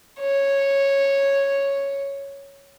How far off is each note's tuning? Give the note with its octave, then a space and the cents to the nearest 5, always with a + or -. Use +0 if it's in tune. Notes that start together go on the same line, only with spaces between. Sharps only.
C#5 -5